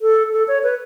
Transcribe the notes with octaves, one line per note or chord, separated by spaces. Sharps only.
A4
A4
C#5
B4